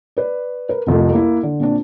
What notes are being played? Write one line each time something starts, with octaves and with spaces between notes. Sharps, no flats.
B4 D5
A#4 B4
C2 F2 C3 A3
A#3 E4
D3
A#2 C4 D4